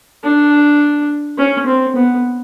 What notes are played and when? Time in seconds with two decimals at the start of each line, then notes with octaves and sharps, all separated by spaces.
0.24 D4
1.38 C#4
1.67 C4
1.96 B3